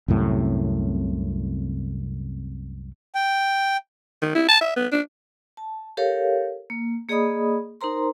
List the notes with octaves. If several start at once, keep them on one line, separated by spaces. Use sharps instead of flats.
C2 F#2 A2 C3
G5
D#3
E4
A5
E5
B3
D4
A5
G4 A4 A#4 C#5 F5
A#3
A#3 G#4 D5 D#5 B5 D#6
D#4 A#4 C5 A#5 C6